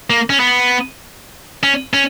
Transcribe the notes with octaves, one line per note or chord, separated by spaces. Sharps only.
A#3
C#4
B3
C#4
C#4